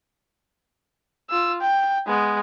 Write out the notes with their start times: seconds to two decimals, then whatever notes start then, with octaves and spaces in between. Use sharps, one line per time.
1.30 F4 E6
1.61 G5
2.07 G#3 B3